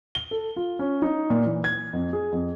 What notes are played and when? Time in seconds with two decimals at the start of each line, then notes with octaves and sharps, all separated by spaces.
0.15 G7
0.31 A4
0.56 F4
0.79 C#4
1.02 D#4
1.30 A#2
1.46 E3
1.64 G#6
1.93 F2
2.13 G#4
2.32 F2